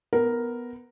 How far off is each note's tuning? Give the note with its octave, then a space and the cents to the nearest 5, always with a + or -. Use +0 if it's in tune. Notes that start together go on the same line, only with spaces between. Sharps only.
B3 +0 A#4 +0